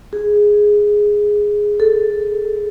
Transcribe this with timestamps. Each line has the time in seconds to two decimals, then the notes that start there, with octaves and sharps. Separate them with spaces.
0.13 G#4
1.80 A4